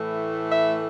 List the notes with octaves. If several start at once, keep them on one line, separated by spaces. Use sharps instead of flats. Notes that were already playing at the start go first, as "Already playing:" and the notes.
Already playing: A2 E3 A3
E5